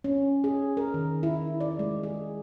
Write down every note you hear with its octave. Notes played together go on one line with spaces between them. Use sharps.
C#4
G#4
A#4
D#3
E4
D5
G#3
G#4